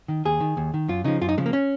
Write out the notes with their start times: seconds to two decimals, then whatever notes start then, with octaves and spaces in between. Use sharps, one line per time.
0.08 D#3
0.25 D#2 G#4
0.40 D#3
0.57 D#2
0.74 D#3
0.88 F#2 F4
1.04 C#3 F3 D#4
1.21 F#2 F4
1.29 D#4
1.37 C#3 G#3
1.41 F3
1.46 A#3
1.53 C#4